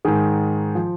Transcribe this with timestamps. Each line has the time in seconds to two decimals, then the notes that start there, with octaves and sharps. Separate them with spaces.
0.05 G#2 D#3 G#4
0.75 F3